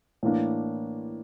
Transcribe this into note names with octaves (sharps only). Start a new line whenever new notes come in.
A2 E3 A#3 D4